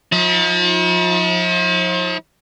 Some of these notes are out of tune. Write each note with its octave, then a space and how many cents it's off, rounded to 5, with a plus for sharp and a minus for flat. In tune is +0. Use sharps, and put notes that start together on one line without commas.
F3 +35 E4 -45